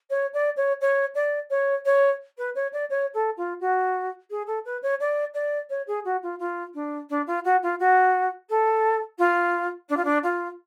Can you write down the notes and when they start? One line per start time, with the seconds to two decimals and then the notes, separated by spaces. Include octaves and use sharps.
0.10 C#5
0.33 D5
0.56 C#5
0.81 C#5
1.14 D5
1.50 C#5
1.85 C#5
2.37 B4
2.55 C#5
2.72 D5
2.89 C#5
3.13 A4
3.37 F4
3.60 F#4
4.30 G#4
4.46 A4
4.65 B4
4.82 C#5
5.00 D5
5.34 D5
5.69 C#5
5.87 G#4
6.04 F#4
6.22 F4
6.39 F4
6.74 D4
7.09 D4
7.27 F4
7.44 F#4
7.62 F4
7.79 F#4
8.49 A4
9.18 F4
9.89 D4
9.96 F4
10.04 D4
10.23 F4